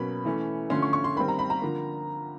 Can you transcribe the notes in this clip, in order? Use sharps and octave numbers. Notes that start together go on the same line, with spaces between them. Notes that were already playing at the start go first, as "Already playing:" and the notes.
Already playing: B2 F#3 A#3 C#4 B5
E3 A3 C#4
D3 F3 A3 C#4 C6
C#6
C#6
C6
D#3 G3 C4 B5
A#5
B5
A#5
D3 F3 A#3